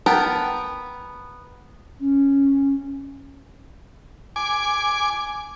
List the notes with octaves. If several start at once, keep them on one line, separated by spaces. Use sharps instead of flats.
B3 A#4 G5 A5
C#4
G#5 D6